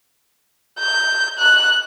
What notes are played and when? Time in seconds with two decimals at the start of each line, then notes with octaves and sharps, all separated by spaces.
0.80 G6
1.39 F#6